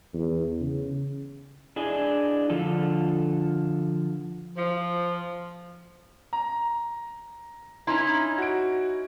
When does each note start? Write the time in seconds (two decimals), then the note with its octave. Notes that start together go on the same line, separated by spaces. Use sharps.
0.14 E2
0.61 C#3
1.76 D4 E4 G#4 D#5
2.50 D3 F3 F4 A4
4.57 F3
6.33 A#5
7.87 C#4 D#4 E4 A#5 C6
8.38 F#4 D7